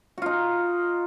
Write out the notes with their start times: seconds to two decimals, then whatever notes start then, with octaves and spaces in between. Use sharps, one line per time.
0.18 F#4
0.22 F4
0.26 D#4